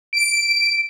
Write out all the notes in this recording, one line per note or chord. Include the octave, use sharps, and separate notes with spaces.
D7